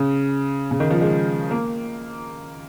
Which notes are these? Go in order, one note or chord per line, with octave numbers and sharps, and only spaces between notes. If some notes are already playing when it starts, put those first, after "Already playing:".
Already playing: C#3
C#3
D#3
F3
G#3
A#3